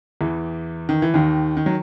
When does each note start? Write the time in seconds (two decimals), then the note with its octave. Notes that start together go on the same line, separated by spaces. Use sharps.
0.21 E2 E3
0.89 D#3
1.02 E3
1.14 D#2 D#3
1.57 D#3
1.66 F#3